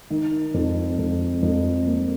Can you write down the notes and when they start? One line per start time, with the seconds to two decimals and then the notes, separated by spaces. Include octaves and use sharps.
0.10 D#3
0.54 F2
0.99 F2
1.42 F2
1.87 A#3